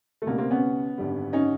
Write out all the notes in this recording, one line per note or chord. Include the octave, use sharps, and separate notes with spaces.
A3
C#2 B2 G3 A#3
A#3 C4
B3 C#4
G#1 F#2 D3 G3
C#4 D#4